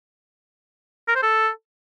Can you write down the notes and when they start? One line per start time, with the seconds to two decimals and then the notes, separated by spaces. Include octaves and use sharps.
1.08 A#4
1.15 C5
1.23 A4